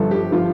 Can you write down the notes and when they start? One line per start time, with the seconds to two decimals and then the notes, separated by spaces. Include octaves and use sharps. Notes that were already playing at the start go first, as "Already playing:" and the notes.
Already playing: G1 G2 F3 A4
0.11 G4
0.32 F3 F4